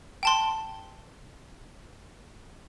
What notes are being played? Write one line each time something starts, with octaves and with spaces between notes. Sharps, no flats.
G5 A5 C6